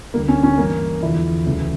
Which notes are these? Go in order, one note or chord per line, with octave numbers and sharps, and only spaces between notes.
D2 D3 G3 A#3
C#4
C#4
G2 E3 G3 A#3
E2 D3 F3 E4
D2 C#3 E3 G3